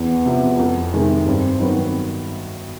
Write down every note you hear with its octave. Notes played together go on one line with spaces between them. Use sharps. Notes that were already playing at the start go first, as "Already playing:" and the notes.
Already playing: E2 B3
C3 F3
F2
C3 D#3 G#3
G2 C4
D#3 F#3 B3 D#4